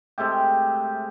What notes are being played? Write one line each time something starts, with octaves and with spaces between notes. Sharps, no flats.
C3 G#3 A3 G4